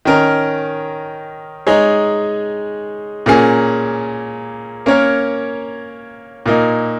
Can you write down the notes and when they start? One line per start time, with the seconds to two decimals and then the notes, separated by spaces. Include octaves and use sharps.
0.05 D#3 C#4 A#4
1.67 G#3 D#4 G#4 C#5
3.26 A#2 A#3 C#4 G#4
4.86 A#3 C#4 A#4 C#5
6.46 A#2 A#3 D#4